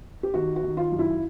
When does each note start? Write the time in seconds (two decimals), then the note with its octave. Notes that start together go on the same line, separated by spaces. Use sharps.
0.23 G4
0.34 D#3 F#4
0.56 F#4
0.63 D#3
0.77 F4
0.92 F#2
0.99 E4